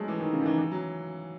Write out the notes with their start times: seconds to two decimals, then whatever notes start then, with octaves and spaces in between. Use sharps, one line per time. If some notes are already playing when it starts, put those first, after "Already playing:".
Already playing: F#3 G#3 A3
0.08 E3
0.20 D#3
0.33 C#3
0.42 D#3
0.46 E3
0.58 E3
0.72 F#3